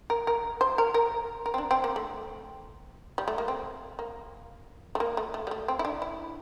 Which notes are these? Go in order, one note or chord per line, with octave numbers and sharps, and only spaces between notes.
A#4
A#4
C5
A#4
A#4
A#4
C4
D4
C4
A#3
A3
G3
A3
A#3
C4
A#3
A3
A#3
A3
A3
G3
A3
C4
E4
D4
E4